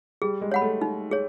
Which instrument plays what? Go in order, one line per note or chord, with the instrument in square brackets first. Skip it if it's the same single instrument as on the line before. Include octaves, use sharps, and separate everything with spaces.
[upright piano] G3 [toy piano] G#4
[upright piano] G#3
[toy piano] C#5 F#5 B5
[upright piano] A3
[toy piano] D#4
G#4 C#5